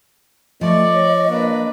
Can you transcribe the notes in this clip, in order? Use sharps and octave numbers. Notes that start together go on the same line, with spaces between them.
F3 A3 D5 D#5 C#6
C#5
A#3 D4 B4